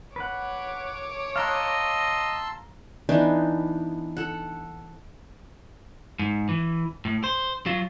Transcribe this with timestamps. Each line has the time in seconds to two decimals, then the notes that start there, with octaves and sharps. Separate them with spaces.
0.16 B4 C#5 F#5 D6
1.36 D#5 F5 A5 A#5 C6 E6 F#6
3.09 E3 B3 D4 D#4
4.17 A4 F#5
6.19 G#2
6.49 E3
7.05 A2
7.24 C5
7.66 F#3 F4